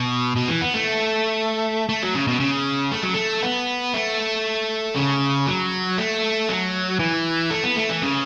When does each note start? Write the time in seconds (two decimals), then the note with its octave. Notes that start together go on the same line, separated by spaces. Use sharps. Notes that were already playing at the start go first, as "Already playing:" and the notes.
Already playing: B2
0.36 B2
0.49 E3
0.62 B3
0.74 A3
1.89 A3
2.03 F#3
2.15 C#3
2.28 B2
2.40 C#3
2.91 A3
3.03 F#3
3.14 A3
3.43 B3
3.94 A3
4.95 C#3
5.47 F#3
5.98 A3
6.49 F#3
6.99 E3
7.51 A3
7.64 B3
7.77 A3
7.89 E3
8.02 C#3